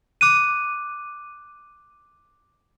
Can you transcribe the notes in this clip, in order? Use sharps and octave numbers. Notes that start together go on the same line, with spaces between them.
D6 F#6 D#7